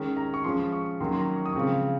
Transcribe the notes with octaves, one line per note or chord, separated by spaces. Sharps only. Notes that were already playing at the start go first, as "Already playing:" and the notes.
Already playing: D#3 G#3 C#4
A#5
C#6
F3 G#3 C#4 C6
C#6
D#3 F#3 A#3 C#4 C6
C6
A#5
C#6
D#6
C#3 F3 G#3 C4 C#6